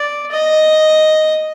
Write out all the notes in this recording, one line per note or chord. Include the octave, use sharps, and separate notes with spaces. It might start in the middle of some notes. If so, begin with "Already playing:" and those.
Already playing: D5
D#5